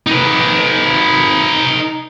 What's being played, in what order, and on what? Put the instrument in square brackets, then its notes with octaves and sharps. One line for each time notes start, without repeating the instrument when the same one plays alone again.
[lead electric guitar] D#4 B4